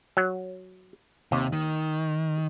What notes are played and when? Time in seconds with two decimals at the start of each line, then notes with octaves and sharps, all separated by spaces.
0.17 F#3
1.32 D#2 C3
1.53 D#3